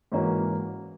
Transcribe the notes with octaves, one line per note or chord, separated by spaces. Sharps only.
G#2 E3 A#3 C#4 F#4